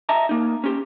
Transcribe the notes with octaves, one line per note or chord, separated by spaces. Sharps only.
D#5 E5 A5 A#5
A#3 D#4
C#4 G4